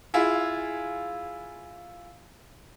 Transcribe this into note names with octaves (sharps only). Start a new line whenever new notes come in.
E4 F4 G#4